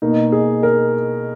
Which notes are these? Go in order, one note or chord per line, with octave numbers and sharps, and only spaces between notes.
B2 A#3 D#4
G#4
A#4